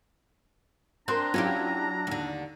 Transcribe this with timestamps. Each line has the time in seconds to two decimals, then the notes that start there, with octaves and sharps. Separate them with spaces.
1.08 C4 D4 A#4 A#5 C6 F#6
1.34 F#3 C#4 E4 F4 G4
2.07 D#2 D3